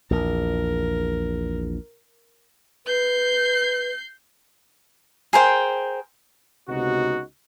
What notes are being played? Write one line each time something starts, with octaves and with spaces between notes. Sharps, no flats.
A#1 E2 A#4
B4 G6 C7
G#4 A#4 C5 G5
C#2 C3 B3 D#4 F#4